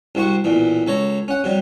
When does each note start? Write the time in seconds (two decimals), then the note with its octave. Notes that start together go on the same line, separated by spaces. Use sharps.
0.15 C2 C3 C4 F#4 C#6
0.44 B1 A#2 E3
0.87 C#2 A4 C#5 A#5
1.28 C#4 F#5
1.44 C3 F#3 G3